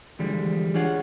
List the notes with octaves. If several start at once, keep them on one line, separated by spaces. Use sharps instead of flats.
D3 E3 F3 G3 G#3
D4 F4 G#4 C#5 F#5